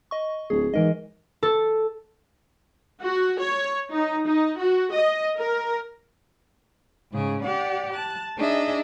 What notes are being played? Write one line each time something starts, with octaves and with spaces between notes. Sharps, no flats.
D#5 C#6
D1 G#4
G#2 E3 A#4 D#5
A4
F#4
C#5
D#4
D#4
F#4
D#5
A#4
G#2 C#3 G#4
G4 D5 F#5
A5 F#6
D4 D#4 G#4 D#5 E5